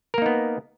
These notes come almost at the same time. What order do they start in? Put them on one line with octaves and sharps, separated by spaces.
A#4 A#3 D#4 B3